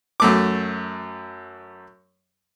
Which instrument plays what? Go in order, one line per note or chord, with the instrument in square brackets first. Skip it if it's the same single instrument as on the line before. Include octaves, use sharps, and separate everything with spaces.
[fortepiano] F#2 A3 D6